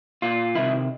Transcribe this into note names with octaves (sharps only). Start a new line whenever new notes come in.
A#2 F4
C3 D#3 E4